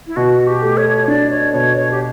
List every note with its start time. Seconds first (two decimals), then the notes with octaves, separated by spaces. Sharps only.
0.07 E4
0.16 B2 F#4
0.47 G4
0.62 A3
0.77 C#5
1.08 D4 D5
1.31 C#5
1.53 B2 C#5
1.77 C#5
1.91 G4